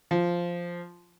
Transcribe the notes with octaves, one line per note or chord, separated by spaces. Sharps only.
F3